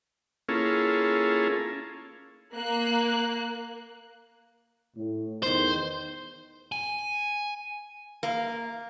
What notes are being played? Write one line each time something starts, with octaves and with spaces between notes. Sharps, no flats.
A#3 C#4 E4 F4 G#4 A4
A#3 F#6
A2
E2 D#3 C5
G#5
A#3